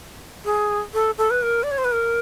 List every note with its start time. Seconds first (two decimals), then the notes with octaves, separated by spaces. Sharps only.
0.45 G#4
0.94 A4
1.18 A4
1.31 B4
1.43 A#4
1.63 D5
1.71 C#5
1.78 C5
1.85 B4
1.92 A#4